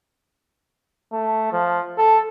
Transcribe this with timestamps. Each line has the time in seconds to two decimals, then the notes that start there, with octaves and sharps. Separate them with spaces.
1.12 A3
1.52 F3
1.98 A4